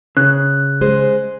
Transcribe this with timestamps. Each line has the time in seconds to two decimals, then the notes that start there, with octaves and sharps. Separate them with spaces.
0.17 C#3 F#6
0.81 G#3 G#4 C5